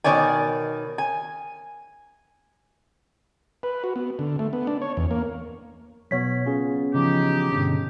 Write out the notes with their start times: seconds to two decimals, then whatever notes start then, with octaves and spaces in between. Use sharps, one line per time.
0.04 B2 D#3 C#5 D5 G#5
0.98 G#5
3.63 B4
3.84 F#4
3.96 B3
4.19 D3
4.39 A3
4.53 B3
4.67 D4
4.82 C#5
4.97 E2
5.11 A#3
6.11 B2 F#3 B3 C#5 B6
6.46 C#4 F4 G#4
6.94 C#3 E3 F3 D#4 G4
7.52 G2 B2 D3